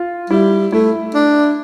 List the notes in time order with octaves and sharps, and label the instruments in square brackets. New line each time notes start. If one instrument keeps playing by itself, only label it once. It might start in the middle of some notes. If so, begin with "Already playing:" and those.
Already playing: [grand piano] F4
[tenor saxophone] G3 [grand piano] E4
[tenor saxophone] A3 [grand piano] E4
[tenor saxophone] D4